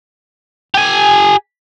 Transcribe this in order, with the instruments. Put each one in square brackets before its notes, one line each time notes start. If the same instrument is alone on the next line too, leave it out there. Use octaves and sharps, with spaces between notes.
[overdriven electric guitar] G4 G#5